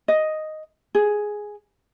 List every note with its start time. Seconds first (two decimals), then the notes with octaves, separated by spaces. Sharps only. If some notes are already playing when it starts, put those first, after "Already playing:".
0.08 D#5
0.95 G#4